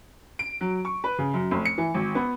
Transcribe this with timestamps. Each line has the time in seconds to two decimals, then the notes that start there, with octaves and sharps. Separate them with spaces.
0.39 D7
0.61 F#3
0.85 C#6
1.04 B4
1.18 C#3
1.34 F#2
1.51 F1
1.65 C#7
1.78 E3
1.94 G#1
2.15 B3